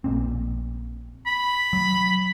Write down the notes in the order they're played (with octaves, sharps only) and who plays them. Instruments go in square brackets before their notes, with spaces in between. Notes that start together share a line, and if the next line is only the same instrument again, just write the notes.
[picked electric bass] A#1 A#2 C4
[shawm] B5
[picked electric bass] F#3